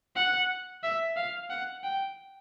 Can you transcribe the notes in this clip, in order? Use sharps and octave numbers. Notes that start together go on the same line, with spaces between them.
F#5
E5
F5
F#5
G5